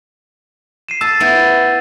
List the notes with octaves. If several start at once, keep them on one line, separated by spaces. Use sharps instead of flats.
C7 D#7 E7
A5 E6 A6
B3 E4 G6 A6 D#7